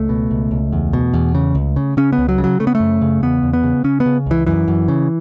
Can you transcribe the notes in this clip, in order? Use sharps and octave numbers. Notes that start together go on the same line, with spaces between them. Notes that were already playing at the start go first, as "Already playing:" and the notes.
Already playing: C#2 A3
B2
C#2
C#2
E2
B2
E2
C#3
C#2
C#3
C#3 C#4
B3
C#2
F#3
C#3
F#3
C#3 A3
B3
A3
F#2
C#3
E2 B3
E2
B3
C#3
C#3 C#4
B3
C#3
C#2 E3
F#2 E3
F#2
C#3